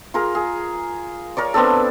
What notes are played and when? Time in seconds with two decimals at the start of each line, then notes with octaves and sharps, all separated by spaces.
0.14 F4 G#4 A#4
0.35 G#4
1.37 A#4 C#5 D5
1.54 B3 C4 D4 A4